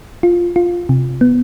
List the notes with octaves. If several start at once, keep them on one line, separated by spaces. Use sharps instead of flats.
F4
F4
C3
B3